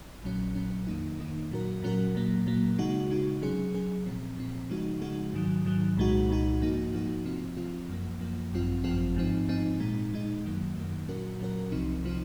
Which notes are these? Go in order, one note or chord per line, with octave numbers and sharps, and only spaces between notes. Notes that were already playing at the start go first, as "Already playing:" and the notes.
A#1 A#2 F#3 C#4
A#1 A#2 F#3 C#4
F2 D#3 A#3 D#4
F2 D#3 A#3 D#4
A#2 F#3 C#4 F#4 A#4
A#2 F#3 C#4 F#4 A#4
A#2 F#3 A#3
A#2 F#3 A#3
C#3 G#3 D#4 F#4
C#3 G#3 D#4 F#4
C3 F#3 C#4 G#4
C3 F#3 C#4 G#4
A#2 F3 C4
A#2 F3 C4
C#3 F3 G#3 D#4 F#4
C#3 F3 G#3 D#4 F#4
G#2 D#3 F#3
G#2 D#3 F#3
C2 A#2 G#3 D#4 F#4
C2 A#2 G#3 D#4 F#4
G#2 F3 A#3 D#4 F#4
G#2 F3 A#3 D#4 F#4
C3 F3 C4 F4
C3 F3 C4 F4
F#2 F3 A#3
F#2 F3 A#3
G#1 F#2 F3 C4 F4
G#1 F#2 F3 C4 F4
G#2 F3 C4 D#4
G#2 F3 C4 D#4
A#2 G#3 D#4
A#2 G#3 D#4
F#2 D#3 F#3 A#3
F#2 D#3 F#3 A#3
A#2 F#3 C#4 F#4 A#4
A#2 F#3 C#4 F#4 A#4
C2 C3 F3 C4 D#4
C3 F3 C4 D#4